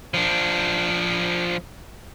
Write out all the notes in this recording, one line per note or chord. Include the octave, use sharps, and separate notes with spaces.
F3 D4